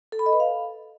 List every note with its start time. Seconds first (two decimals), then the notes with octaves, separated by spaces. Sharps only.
0.12 A4
0.19 B5
0.26 D#5
0.33 B4
0.40 F5